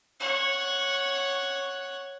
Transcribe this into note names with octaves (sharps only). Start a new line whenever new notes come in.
C#5 F#5